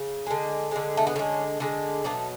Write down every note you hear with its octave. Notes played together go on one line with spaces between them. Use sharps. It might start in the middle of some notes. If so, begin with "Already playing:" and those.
Already playing: C#3
D3 G#3
D3 G#3
A3
B3
D3 G#3 C#4
D3 G#3
B2 F#3 A3 D4